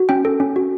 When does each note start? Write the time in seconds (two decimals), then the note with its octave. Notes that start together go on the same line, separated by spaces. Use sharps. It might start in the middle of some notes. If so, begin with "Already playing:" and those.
Already playing: F#4
0.09 C#4 G5
0.25 A4
0.40 C#4
0.56 F#4